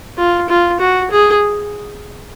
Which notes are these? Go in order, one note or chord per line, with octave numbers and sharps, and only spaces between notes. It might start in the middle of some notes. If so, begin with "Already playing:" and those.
F4
F4
F#4
G#4